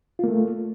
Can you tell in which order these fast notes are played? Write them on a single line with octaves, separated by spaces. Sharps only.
F4 A#3 A3